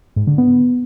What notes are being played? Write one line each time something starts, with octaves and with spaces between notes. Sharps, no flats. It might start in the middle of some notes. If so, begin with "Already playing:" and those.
G#2
D3
B3